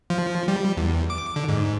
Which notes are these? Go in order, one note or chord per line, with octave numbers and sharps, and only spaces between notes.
F3
G3
E2
D6
D3
G#2